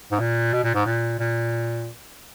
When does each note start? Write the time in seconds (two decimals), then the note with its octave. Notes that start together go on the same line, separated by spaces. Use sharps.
0.12 G#2
0.20 A#2
0.53 B2
0.64 A#2
0.75 G#2
0.86 A#2
1.19 A#2